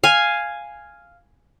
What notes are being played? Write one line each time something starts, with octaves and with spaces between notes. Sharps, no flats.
F5 G#5